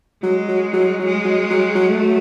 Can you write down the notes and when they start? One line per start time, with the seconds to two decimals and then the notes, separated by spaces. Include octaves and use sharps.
0.23 F#3 G#3
0.48 F#3
0.73 F#3
0.99 F#3
1.05 G#3
1.25 F#3
1.50 F#3
1.75 F#3
1.87 A3
2.02 F#3